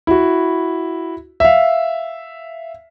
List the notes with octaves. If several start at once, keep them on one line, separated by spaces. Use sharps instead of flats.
E4 F#4
E5 F5